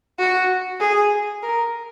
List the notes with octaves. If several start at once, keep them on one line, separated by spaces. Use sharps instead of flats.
F#4
G#4
A#4